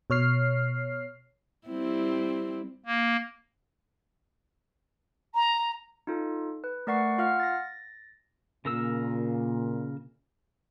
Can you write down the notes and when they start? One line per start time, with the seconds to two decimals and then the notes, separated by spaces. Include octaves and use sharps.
0.10 B2 C#5 F6 C7
1.67 G3 C4 E4
2.86 A#3
5.34 A#5
6.07 D#4 F4 A4
6.64 B4
6.87 A3 A#4 D5 F#5 C#6 C7
7.18 F4 F5 F#5 F6
7.40 A6 A#6
8.65 A#2 C#3 A#4 E6